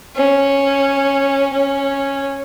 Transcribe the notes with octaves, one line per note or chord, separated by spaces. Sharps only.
C#4
C#4